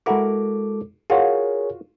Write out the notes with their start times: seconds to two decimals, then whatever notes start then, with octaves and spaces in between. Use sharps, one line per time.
0.06 G#3 E4 F#4 A4 A#4 D6
1.10 F4 F#4 G#4 A#4 C#5